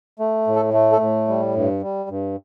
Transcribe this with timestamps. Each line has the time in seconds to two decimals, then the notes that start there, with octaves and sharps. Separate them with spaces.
0.19 A3
0.47 A2
0.56 A4
0.74 A3
0.92 A4
1.01 A2
1.28 G3
1.55 G2
1.83 G3
2.10 G2